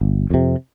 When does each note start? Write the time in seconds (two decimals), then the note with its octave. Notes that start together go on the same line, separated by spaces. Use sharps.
0.01 G1
0.30 F2 C3